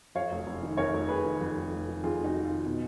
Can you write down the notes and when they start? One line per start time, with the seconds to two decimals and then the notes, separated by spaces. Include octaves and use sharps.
0.15 F2 C#5 F5
0.32 F1
0.46 F1
0.63 D#3
0.77 F2 A#4 C#5
0.93 F1
1.09 F1 G#4 B4
1.25 D#3
1.41 F2
1.56 F1
1.71 F1
1.87 D#3
2.03 F2 F4 G#4
2.19 F1
2.24 D#4 F#4
2.35 F1
2.45 D#3 F4
2.65 B2